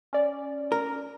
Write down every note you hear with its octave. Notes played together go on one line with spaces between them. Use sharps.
C#4 D5
A#4